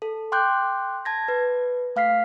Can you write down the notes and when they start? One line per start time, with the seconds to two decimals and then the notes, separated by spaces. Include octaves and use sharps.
0.02 A4
0.32 G5 C6 D6 F#6 G6
1.05 A5 G#6 A#6
1.28 B4
1.96 A3 F5 F6 B6 C7